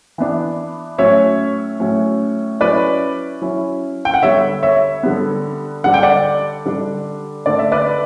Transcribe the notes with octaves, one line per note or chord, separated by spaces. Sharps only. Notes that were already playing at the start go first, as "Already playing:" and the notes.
E3 B3 D4
A2 F#3 C#4 C#5 E5
A2 F#3 C#4
F#3 C#4 E4 B4 D5
F#3 C#4 E4
G5
F#5
D3 G3 B3 C#5 E5
C#5 E5
D3 G3 B3
D3 G3 D4 F#5
G5
D5 F#5
D3 G3 D4
D3 A3 D4 D5
E5
B4 D5